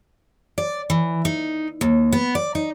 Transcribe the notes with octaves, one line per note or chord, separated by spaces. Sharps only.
D5
E3
D#4
D#2
B3
D5
D#4